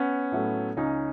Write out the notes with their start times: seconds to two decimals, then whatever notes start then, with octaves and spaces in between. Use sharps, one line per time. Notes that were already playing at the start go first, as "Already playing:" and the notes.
Already playing: B3 C#4
0.32 A2 F#3 A3
0.77 C#2 C#4 D#4